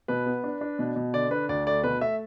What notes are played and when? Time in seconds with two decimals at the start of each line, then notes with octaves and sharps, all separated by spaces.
0.08 B2 B4
0.26 B3
0.44 D4
0.61 D4
0.79 B2
0.96 B2
1.14 D3 D5
1.31 D4 B4
1.49 D2 D5
1.67 A3 D5
1.84 B2 B4
2.01 A3 E5